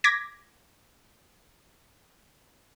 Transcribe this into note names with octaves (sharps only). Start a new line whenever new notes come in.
D6 G#6 A#6 B6